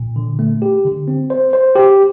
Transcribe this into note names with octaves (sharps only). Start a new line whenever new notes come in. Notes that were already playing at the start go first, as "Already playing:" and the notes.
Already playing: A#2
D3
A3
G4
D3
C4
C5
C5
G4